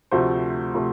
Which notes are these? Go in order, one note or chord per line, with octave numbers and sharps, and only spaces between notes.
D2 C3 F3 A3 C5
C3 F3 A3